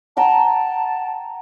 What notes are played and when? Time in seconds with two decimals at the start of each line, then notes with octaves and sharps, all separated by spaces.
0.17 F#5 G5 A5 A#5
0.45 A5